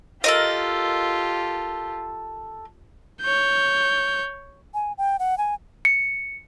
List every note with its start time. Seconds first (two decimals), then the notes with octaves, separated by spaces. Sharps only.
0.24 F4 G4 A4 A#4 D#5
3.21 C#5 G6
4.74 G#5
4.98 G5
5.19 F#5
5.38 G#5
5.85 C#7